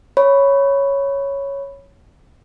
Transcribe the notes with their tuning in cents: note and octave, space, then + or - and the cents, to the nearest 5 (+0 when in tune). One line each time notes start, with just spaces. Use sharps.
C#5 +0 B5 +0